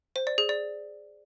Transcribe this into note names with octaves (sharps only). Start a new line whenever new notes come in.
C5
D5
G#4
D5